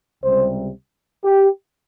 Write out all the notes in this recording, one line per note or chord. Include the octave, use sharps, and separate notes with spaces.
C#2 C3 G3 C5
G4